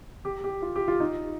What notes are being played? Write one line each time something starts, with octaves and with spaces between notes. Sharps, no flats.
G4
G4
F4
G4
F4
D#4